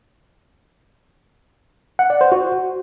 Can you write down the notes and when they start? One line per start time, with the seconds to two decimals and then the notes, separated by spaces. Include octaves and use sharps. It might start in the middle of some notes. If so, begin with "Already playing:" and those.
1.99 F#5
2.10 D5
2.21 C5
2.32 F#4